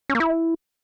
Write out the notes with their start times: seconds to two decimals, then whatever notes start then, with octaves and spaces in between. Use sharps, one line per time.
0.09 C#4
0.15 A#3
0.20 E4